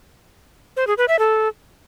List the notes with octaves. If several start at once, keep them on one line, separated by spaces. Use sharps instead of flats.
C5
G#4
B4
E5
A4